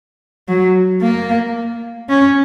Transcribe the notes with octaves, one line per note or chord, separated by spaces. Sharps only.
F#3
A#3
C#4